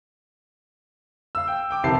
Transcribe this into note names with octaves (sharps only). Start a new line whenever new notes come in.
F5 E6
G5
G5 D6
F1 C2 C4 G4 A5 C7